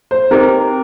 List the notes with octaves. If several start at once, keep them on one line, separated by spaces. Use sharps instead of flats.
C5
C4 D#4 G4 A#4